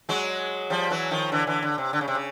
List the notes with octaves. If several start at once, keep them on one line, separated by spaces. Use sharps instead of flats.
F#3 G#3
F3 G3
E3 F#3
D#3 F3
D3 E3
D3 E3
D3
C3
D3
C#3
C3
C#3